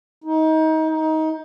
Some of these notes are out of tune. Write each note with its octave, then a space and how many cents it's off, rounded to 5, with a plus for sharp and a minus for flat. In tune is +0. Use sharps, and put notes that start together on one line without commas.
D#4 +25
D#4 +20